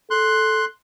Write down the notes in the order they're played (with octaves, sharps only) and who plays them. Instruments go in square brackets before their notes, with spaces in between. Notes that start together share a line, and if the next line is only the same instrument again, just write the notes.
[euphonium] A4 [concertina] C6 F#6